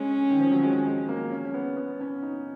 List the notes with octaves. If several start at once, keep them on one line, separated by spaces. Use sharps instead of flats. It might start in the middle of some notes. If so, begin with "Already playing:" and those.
Already playing: G#3 C#4
D#3
F3
F#3
G#3
G#3
A#3
C#4
C#4
B3
B3
C#4
D#4